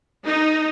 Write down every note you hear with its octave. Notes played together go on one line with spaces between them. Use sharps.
D#4